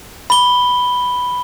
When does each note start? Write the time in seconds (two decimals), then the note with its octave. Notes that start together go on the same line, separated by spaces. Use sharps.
0.30 B5 G7